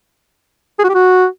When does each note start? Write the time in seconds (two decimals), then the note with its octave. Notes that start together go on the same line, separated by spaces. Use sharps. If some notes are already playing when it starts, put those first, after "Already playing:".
0.79 G#4
0.84 F#4
0.89 G4
0.94 F#4